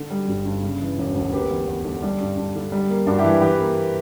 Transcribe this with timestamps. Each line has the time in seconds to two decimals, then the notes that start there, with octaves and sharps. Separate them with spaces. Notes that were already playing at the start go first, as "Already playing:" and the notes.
Already playing: D3
0.10 G3
0.28 G1
0.45 G2
0.63 C#3
0.81 E3
0.98 E1
1.15 D2
1.33 A#3 G4 B4
1.51 E2
1.68 E2
1.85 D3
2.02 G3 D4
2.21 G2
2.37 G2
2.56 D3
2.72 G3
2.90 A#3
3.07 G2 D4 F#4
3.19 E4 G4
3.24 E3
3.41 E3 G4 B4
3.59 A#3